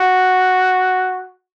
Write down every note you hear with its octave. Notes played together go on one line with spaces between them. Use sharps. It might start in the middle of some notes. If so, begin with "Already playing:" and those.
Already playing: F#4